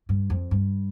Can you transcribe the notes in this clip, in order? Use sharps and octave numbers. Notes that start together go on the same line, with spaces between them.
G2
F2
G2